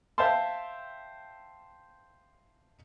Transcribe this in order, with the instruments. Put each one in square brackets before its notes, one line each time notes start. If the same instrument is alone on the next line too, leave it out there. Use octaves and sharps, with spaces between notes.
[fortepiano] C5 E5 F5 G5 A5 C6